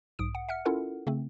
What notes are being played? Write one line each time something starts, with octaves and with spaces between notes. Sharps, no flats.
B1 G#2 D#6 D7
F#5
E5 F#5 F6 C#7
C#4 E4 F4 A4 A#4 F#5
C#3 A3 C4